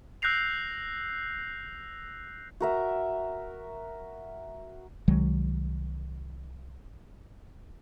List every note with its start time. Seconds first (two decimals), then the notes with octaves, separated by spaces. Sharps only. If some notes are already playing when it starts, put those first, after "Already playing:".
0.22 E6 F#6 G6 A#6 C7 F7
2.60 F#4 A#4 E5
5.08 C2 D#3 F#3 G#3